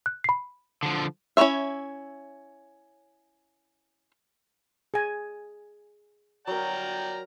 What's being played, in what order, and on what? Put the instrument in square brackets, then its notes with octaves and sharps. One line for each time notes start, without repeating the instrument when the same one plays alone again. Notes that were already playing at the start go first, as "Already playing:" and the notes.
[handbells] F#6
B5 C7
[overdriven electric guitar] D3 F3
[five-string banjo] C#4 E4 B4 C#5 E5
[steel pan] G#4 G#5
[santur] F#3 A#4 [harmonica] D5 G5 A#5